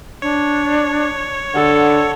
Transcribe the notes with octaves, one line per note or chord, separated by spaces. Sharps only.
D4 C#5
D3 A4 F#5